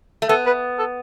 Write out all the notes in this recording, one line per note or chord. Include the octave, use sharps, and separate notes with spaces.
A3
B3 A4
B4
A4